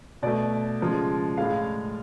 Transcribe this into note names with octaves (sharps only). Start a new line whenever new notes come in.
B2 A3 D5
C#3 F3 G#3
A2 G#3 F5